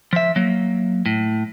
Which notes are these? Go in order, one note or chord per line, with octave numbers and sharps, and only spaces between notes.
F3 E5
F#3 A#3
A2